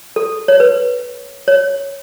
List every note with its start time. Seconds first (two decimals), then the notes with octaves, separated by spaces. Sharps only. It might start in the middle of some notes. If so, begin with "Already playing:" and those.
0.16 A4
0.48 C#5
0.60 B4
1.48 C#5